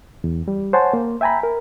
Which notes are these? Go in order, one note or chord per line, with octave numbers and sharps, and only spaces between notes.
E2
G3
C5 C#5 F#5 G#5 A5 C6
A#3
E5 G5 G#5 A#5 B5
A#4